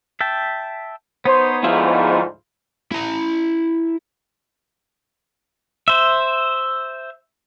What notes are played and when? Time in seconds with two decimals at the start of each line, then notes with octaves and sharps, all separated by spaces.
0.21 E5 G5 A5
1.25 B3 D#4 C5 C#5
1.64 D2 G#2 F3 E4 F4
2.92 E4 A#5
5.88 C5 E5